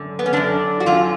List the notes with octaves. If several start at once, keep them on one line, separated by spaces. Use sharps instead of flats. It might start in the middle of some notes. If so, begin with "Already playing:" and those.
Already playing: F#2 D3
B3
C#4
F#2 D3 D4
F#4
F#2 D3 F4